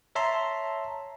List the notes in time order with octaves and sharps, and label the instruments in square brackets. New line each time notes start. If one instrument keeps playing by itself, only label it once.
[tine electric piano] C#5 E5 A5 A#5 C6